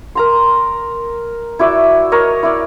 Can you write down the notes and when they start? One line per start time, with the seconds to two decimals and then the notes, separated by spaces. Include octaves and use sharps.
0.15 A#4 A#5 C6
1.59 E4 F#4 D5 E5
2.12 A#4 C#5 D#5
2.43 E4 D5